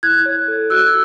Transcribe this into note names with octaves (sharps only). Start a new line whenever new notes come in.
E4 F#6 G#6
C#5
A4
F#4 E6 F#6